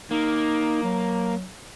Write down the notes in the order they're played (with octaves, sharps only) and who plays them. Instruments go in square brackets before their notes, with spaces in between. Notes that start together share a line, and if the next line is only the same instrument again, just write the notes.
[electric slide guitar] A#3 [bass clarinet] D#4
[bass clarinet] F#3